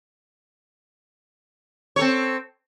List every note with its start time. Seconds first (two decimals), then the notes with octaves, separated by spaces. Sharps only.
1.96 C#5
1.99 A4
2.01 C4